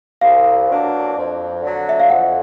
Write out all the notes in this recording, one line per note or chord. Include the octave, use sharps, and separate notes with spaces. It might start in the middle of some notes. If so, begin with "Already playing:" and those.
C2 F5
B2 F#3 A#3 D4
F2
D3 F#3
E5
F5
F2 F#5